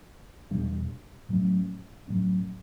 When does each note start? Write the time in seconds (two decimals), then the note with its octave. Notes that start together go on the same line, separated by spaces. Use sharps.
0.51 E2 B2 G3 D4
1.29 A2 F#3 A3 C#4
2.08 A2 F#3 A3 C#4